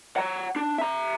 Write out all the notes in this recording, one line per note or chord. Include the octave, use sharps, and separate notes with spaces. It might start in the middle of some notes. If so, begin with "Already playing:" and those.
F#5 A#5
D4
E5 A#5